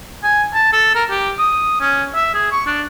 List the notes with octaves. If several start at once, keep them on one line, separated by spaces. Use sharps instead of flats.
G#5
A5
A4
A#4
G4
D#6
C#4
E5
G#4
C#6
D4